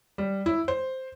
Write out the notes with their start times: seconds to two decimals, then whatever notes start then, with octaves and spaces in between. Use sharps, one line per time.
0.18 G3
0.46 E4
0.68 C5